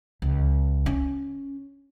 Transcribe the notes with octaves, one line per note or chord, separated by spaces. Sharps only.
C#2
C#4